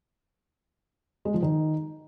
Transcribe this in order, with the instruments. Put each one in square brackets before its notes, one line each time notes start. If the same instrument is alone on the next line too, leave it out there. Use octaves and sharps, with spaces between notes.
[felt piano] G#3
F3
D#3